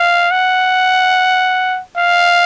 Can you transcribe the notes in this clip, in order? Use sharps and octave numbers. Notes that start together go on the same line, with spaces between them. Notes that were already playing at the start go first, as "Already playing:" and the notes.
Already playing: F5
F#5
F5